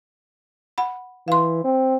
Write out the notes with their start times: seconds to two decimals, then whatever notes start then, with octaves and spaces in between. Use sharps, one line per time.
0.78 F#5 B5
1.28 E3 F5 C6
1.64 C4